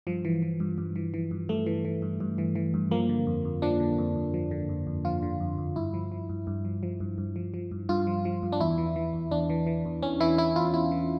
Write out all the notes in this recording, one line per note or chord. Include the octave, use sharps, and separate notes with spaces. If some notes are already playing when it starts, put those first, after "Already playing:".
G2 F3
E3
E3
G2
G2
E3
E3
G2
G2 A3
E3
E3
G2
G2
E3
E3
G2
F3 A#3
D3
F2
F2
F3 D4
D3
F2
F2
F3
D3
F2
F2
F3 F4
D3
F2
F2
G2 E4
F3
F3
G2
G2
F3
F3
G2
G2
F3
F3
G2
G2 F4
F3
F3
G2
D4
E2 E4
E3
E3
E2
E2 D4
E3
E3
E2
E2 C#4
E3 E4
E3 E4
E2 F4
E2 E4
E3